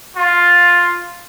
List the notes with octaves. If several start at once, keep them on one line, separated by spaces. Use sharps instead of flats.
F4